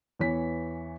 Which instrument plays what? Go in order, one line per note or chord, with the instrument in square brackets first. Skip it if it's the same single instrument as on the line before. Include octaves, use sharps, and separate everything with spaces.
[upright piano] E2 E3 C#5 B6